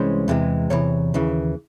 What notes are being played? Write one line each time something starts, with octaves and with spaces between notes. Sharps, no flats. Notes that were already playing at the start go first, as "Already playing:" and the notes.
Already playing: C2 E3 G#3 C#4 C5
E2 C3 E3 G#3
E2 C3 E3 C#5
D#2 C#3 E3